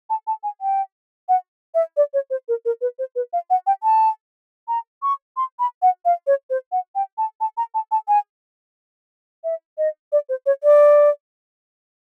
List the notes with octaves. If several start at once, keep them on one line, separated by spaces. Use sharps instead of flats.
A5
A5
G#5
G5
F#5
E5
D5
C#5
C5
A#4
A#4
B4
C5
B4
F5
F#5
G5
A5
A#5
C#6
C6
B5
F#5
F5
C#5
C5
F#5
G5
A5
A5
A#5
A5
A5
G#5
E5
D#5
D5
C5
C#5
D5